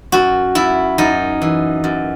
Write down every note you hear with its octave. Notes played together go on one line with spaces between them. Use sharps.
F#2 F#4
F#2 E4
F#2 D#4
E3
F#2